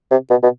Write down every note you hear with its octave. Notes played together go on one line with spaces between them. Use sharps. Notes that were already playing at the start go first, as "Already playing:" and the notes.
C3
B2
B2